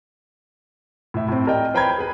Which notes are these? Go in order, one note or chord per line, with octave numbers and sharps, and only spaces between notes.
A2 E5
A2 C4
A#4 D5 D#5 G5
B4 C5 G5 A#5 B5 G#6
G#4 B4